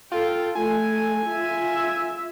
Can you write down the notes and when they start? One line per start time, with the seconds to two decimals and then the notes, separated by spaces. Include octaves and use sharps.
0.12 F4 A4 G5
0.55 A3 G#5
1.28 F4 E5